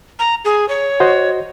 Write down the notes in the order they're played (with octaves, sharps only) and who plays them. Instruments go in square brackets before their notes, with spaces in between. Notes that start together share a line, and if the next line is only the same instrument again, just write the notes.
[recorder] A#5
G#4
C#5
[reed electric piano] F#4 C5 D#5